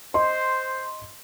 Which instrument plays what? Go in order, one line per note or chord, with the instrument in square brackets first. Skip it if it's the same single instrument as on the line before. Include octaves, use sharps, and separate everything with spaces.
[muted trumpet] C5 [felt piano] D#5 C6